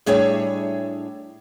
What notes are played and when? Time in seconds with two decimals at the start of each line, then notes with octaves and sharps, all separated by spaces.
0.06 A2 G3 D4 G#4 C#5 E5